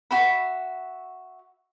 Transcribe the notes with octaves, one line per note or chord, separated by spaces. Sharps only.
F#4 E5 B5